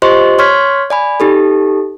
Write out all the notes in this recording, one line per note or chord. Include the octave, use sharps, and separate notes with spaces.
F4 G4 C5 D#5 C6 C#6
C#5 C6 C#6 F6 G#6 B6
D5 G#5 B5
D#4 G4 A4